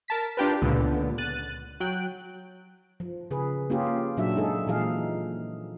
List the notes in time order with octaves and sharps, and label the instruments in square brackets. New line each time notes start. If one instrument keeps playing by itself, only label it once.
[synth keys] A#4 A5 B6
D4 F4 G4 A#4 B4
C#2 A#2 D3 B3
F#6 A6 D#7
F#3 G5 F#6 D7
[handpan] F3
C#3 G#4 B4
A#3 C#4 F4 G4 G#4
A#2 F#3 D4 E5
G#3 D#4 G#4 A4
A#2 E3 F3 D#4 G#4 F5